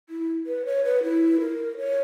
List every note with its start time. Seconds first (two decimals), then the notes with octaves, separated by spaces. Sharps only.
0.09 E4
0.46 B4
0.66 C#5
0.84 B4
1.03 E4
1.40 A#4
1.77 C#5